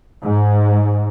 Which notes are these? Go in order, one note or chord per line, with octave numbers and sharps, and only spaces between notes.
G#2